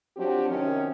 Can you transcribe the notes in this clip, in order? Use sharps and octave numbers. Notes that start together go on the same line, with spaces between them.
F3 F#3 C4 D4 F#4 G4
F#2 C3 D#3 C#4